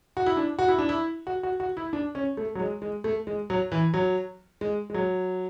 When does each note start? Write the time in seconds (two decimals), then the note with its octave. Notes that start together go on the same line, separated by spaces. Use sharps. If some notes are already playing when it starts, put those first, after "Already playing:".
0.17 F#4
0.26 E4
0.37 D4
0.59 F#4
0.68 E4
0.78 D4
0.89 E4
1.27 F#4
1.43 F#4
1.60 F#4
1.77 E4
1.93 D4
2.15 C#4
2.37 A3
2.55 F#3
2.59 G#3
2.82 G#3
3.04 A3
3.27 G#3
3.50 F#3
3.72 E3
3.94 F#3
4.61 G#3
4.90 G#3
4.94 F#3